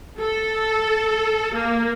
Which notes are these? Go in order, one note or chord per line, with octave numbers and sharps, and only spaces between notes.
A4
A#3